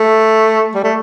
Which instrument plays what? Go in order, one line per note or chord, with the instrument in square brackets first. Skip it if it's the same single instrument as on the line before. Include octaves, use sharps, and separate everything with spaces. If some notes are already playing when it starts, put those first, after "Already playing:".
Already playing: [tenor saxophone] A3
G3
A3